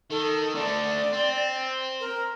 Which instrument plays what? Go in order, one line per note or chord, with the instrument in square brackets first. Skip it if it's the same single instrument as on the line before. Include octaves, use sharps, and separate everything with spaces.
[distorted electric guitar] D#3 [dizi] A4
[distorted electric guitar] D3 A3 [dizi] D5
[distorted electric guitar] C4
[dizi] A#4